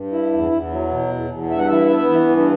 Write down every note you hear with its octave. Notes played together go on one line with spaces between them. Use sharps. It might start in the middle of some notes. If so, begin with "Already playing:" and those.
Already playing: G2
E4
E2
E2
F#3
B2
E2
E2
G2 E5
F#5
E4 E5
B3
E3
G2